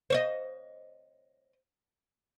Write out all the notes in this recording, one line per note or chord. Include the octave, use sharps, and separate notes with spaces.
C5 C#5 D#5